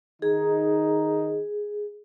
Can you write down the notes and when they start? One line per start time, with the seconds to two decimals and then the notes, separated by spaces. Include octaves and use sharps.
0.22 D#3 D#4 G#4